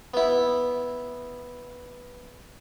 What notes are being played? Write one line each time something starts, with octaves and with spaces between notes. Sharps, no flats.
B3 E4